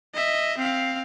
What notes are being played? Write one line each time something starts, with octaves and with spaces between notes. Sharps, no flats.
D#5 E5
C4 F5